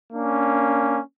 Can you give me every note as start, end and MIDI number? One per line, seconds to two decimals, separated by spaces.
0.13 1.00 58
0.13 1.00 61
0.13 1.00 62